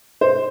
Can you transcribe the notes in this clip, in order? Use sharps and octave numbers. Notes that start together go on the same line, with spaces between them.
C5